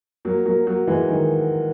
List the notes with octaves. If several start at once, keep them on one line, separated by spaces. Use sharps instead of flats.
F#3 A#3
F#3 A#3
F#3 A#3
E3 G#3
D#3 F#3